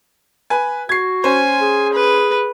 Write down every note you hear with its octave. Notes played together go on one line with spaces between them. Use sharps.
B4 G#5
F#4 G#6 C7
C#4 C5 G#5
G#4
B4